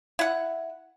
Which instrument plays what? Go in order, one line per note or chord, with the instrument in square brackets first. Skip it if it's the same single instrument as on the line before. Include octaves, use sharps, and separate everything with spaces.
[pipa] E4 F#5